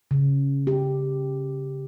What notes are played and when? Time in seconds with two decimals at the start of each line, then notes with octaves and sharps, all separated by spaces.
0.11 C#3
0.67 G4